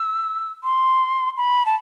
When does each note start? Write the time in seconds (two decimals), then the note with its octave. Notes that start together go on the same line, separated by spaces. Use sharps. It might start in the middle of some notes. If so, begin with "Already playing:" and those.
Already playing: E6
0.64 C6
1.37 B5
1.66 A5